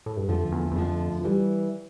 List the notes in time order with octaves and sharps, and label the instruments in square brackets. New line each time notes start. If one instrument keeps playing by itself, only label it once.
[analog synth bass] A2
G2
[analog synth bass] F2 [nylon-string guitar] D3 F3 A3
[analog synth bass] E2
E2
[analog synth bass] F2 [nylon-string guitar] D3 F3 A3
[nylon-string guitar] E3 G3